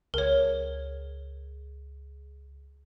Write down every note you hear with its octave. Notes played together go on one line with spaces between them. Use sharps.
C#2 A#4 C#5